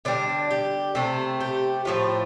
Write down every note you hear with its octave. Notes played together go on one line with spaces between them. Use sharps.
D3 G3 D4
G4
C3 A3 A4
G4
A2 F3 A3 F4